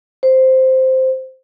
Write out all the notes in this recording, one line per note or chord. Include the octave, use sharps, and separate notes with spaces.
C5